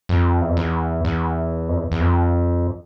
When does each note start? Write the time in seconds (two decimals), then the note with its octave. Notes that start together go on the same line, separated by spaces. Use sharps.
0.09 F2
0.41 E2
0.49 F2
0.57 E2
1.05 E2
1.69 F2
1.76 E2
1.92 E2
2.00 F2